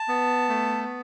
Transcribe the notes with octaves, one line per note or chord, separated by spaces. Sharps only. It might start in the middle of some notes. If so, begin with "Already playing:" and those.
Already playing: A5
B3
A3